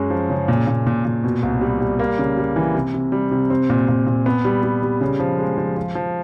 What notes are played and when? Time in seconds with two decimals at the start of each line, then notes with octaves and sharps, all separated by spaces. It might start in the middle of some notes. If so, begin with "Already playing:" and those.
Already playing: F#2 G#3
0.10 F3
0.30 C#3
0.48 A#2
0.67 A#2
0.87 A#2
1.05 A#2
1.24 B2
1.43 C2
1.61 G3
1.81 G3
1.99 A#3
2.19 C#3
2.37 G3
2.56 E3
2.75 C3
2.94 C3
3.12 G3
3.31 C3
3.50 C4
3.70 A#2
3.88 A#2
4.07 A#2
4.26 B3
4.45 G3
4.63 G3
4.83 G3
5.01 C#3
5.20 F3
5.39 G#3
5.58 F3
5.77 F3
5.95 F3